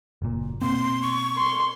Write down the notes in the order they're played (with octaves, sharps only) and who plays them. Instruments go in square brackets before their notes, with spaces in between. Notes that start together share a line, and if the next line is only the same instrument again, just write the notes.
[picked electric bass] F#1 A#2
[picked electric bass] B2 A#3 C4 [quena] C6
[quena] C#6
[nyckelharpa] C6